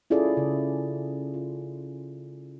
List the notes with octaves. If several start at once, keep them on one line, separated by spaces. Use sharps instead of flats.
C#4 E4 F4 G#4 A4 D5
C#3
F4